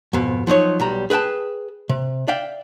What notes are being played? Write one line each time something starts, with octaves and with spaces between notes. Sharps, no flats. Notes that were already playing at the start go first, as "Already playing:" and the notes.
F2 G#2 B2
F3 F#3 D#4 C#5
B1 G3 A#5
G#4 B4 D#5 G5 A5
C3
D5 E5 F5 G5